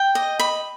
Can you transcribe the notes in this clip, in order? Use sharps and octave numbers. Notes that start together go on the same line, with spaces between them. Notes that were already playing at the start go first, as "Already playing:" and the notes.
Already playing: G5
D#5
B5